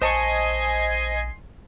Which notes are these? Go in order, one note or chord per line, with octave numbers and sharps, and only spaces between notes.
A#1 C5 D#5 G#5 A5 C6 C#6